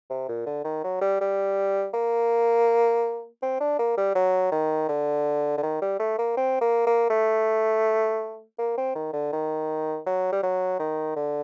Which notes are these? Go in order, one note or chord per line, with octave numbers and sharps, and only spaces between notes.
C3
A#2
D3
D#3
F#3
G3
G3
A#3
C4
D4
A#3
G3
F#3
D#3
D3
D3
D#3
G3
A3
A#3
C4
A#3
A#3
A3
A#3
C4
D#3
D3
D#3
F#3
G3
F#3
D#3
D3